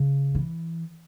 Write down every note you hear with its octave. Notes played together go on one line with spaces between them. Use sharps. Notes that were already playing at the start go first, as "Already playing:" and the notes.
Already playing: C#3
E3